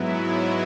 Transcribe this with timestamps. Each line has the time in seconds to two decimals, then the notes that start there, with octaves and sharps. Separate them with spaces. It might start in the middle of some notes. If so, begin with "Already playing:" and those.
Already playing: G#2 F#3 B3 E4